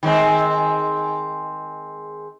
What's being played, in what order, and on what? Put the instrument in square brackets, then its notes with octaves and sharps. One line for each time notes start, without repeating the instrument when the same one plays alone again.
[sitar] D#3 G#3 C4